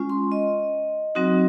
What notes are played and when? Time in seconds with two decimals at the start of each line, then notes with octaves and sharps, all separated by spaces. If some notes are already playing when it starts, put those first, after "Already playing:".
Already playing: G#3 C#4 F4
0.10 C6
0.32 D#5
1.15 F#3 C4 D#4 F#4